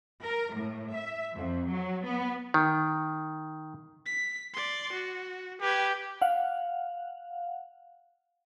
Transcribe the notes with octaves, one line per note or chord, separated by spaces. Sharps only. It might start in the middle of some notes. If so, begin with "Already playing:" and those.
A#4
A2
E5
F2
F#3
B3
D#3
B6
D5 C6
F#4
G4 B4 G#6
F5 F#5